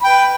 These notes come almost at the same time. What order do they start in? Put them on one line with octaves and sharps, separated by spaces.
B5 G5 B4